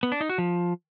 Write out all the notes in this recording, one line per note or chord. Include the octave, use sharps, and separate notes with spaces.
B3
D4
D#4
F#4
F3